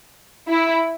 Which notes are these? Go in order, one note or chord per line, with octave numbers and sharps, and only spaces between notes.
E4